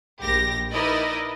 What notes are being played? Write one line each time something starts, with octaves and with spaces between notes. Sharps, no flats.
A#1 G4 A#6
D#4 E4 A#4 B4 D5 D#5